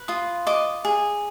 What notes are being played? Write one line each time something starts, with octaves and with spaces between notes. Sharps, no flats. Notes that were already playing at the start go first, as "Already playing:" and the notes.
Already playing: B4
F4 D#6
D#5 D6
G#4